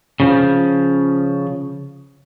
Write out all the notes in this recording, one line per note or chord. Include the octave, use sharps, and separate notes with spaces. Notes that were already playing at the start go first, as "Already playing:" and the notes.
C#3 F3